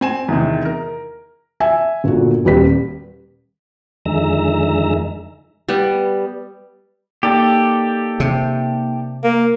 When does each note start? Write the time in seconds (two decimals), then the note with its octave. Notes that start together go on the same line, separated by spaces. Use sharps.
0.01 C4 G#5 E7
0.28 E2 C3 D#3
0.65 A#4
1.60 E5 G#5
2.04 G1 A#2 F#4
2.45 D#1 G3 B4 B6
4.06 F2 D3 D#3 G#3 E5 A#5
5.69 G3 B3
7.23 A#3 D#4 G4 A4 D5
8.20 C3
9.24 A#3